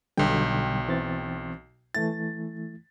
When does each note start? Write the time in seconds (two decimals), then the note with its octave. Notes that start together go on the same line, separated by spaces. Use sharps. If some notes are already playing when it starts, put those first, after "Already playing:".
0.17 B1 B2 D3 G3 G5
0.88 E3 C4 A6
1.95 E3 A3 E4 A6